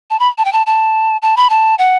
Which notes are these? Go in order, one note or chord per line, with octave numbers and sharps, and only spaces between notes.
A5
B5
A5
G5
A5
A5
A5
B5
A5
F#5